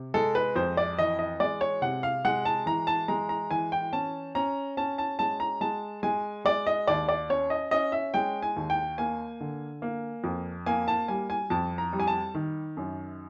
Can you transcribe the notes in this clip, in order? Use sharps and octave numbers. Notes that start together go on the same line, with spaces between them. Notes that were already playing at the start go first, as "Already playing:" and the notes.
Already playing: C3
G#3 A4
B4
F2 C5
D5
E3 D#5
D#5
G#3 D5
C#5
C3 F#5
F5
G#3 F#5
A5
E3 A#5
A5
G#3 A#5
A#5
E3 G#5
G5
C#4 A5
C#4 A#5
C#4 A5
A5
G#3 A5
A#5
G#3 A5
G#3 G#5
G#3 D5
D#5
D#2 D5
D5
C#4 C#5
D#5
C#4 D#5
E5
G#3 G5
G#5
D#2
G5
A#3 G#5
D3
A#3
F2
A#3 G#5
A5
G3 G#5
G#5
F2 A5
A#5
G3
G#5
A5
D#3
F#2